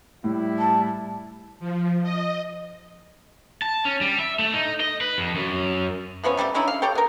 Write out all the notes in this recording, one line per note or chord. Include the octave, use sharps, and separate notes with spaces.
A2 G3 E4
A5
F3
D#5
A5
C#4
G3
E5
A3
D#4
D#5
B4
F2
F#2
E3 F3 B3 C#4
C3 G3 A3 G4
D3 C#4 D#4 E4
F5
G4 A4 C#5 G5
B3 A#4